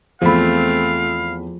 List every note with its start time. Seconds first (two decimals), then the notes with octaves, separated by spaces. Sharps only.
0.22 E2 F3 A3 C4 F5 B5